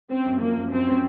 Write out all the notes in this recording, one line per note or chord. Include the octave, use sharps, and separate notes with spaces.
C4 C#4
F#2
F3 A#3
F#2
F#2 C4
C#4